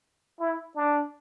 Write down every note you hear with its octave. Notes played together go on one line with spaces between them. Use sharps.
E4
D4